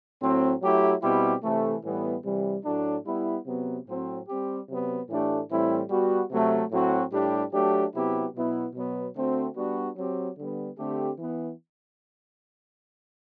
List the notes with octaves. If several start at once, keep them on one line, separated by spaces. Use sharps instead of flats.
A2 F#3 C4
F#3 A3 E4 G4
B2 G3 C4 E4 G4
C3 E3 A3
A2 E3 G3 B3
C3 E3 G3
A2 F#3 A3 D4
G3 B3 E4
C3 F#3 B3
A2 F#3 C4
G3 C4 G4
C3 F#3 B3
A2 E3 A3 D4 G4
A2 E3 G3 C4 E4
G3 B3 F#4
C3 F#3 A3
A2 F#3 C4 F#4
A2 G3 D4 G4
F#3 A3 D4 G4
C3 F#3 B3 E4 G4
B2 F#3 B3 E4
B2 F#3 B3
D3 A3 C4 F#4
G3 B3 D4 F#4
F#3 C4 G4
D3 G3 B3
D3 A3 C4 G4
E3 B3